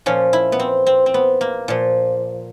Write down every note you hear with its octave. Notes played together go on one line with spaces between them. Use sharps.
A#2 F3 C#4
E4
B3
C4
C4
C4
B3
A#3
A#2 F3